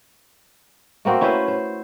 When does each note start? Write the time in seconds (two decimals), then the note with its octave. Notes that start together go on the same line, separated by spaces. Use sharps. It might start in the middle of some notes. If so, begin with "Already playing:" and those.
1.05 A3 A#3 C4 F#4
1.21 C#4 E4 B4 C5
1.48 C5